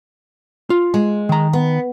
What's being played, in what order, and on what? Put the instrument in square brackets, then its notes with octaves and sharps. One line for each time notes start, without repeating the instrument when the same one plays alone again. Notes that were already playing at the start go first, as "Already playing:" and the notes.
[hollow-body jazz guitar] F4
[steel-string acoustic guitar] G#3
[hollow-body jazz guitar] D#3 A#5
[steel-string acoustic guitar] B3